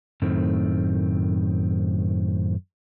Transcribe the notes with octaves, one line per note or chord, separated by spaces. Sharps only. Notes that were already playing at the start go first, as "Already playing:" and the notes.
F#2 A2 D#3 A3 C4